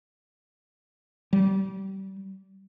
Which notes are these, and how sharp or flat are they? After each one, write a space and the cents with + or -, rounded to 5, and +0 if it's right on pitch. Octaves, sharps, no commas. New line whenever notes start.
G3 -30